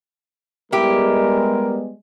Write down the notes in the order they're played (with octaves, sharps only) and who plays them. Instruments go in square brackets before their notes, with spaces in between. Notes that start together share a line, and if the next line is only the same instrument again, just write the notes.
[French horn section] G3 G#3 [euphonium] B3 [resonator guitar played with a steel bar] E4 G4 [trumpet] A#4